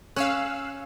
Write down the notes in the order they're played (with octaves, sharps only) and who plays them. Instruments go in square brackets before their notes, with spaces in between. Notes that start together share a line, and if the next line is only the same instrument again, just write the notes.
[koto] C#4 [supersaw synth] F5 E6 F#6